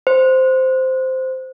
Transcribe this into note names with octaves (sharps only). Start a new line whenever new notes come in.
C5